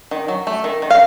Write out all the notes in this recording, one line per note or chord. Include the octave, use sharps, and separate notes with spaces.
D#3
F#3
A3
D#3
D#3
F5